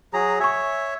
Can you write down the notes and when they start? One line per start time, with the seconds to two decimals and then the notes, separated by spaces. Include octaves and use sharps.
0.13 F#3 G#4 A#5
0.40 C#5 E5 G#5 C#6